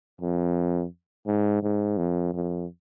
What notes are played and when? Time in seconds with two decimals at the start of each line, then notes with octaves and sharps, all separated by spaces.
0.21 F2
1.27 G#2
1.63 G#2
1.98 F2
2.34 F2